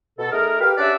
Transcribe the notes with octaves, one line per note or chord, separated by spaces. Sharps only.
B2 A4
A3 D#4 G#4 A#4
G4 B4 F5
C#4 D4 G4 D5 E5 F#5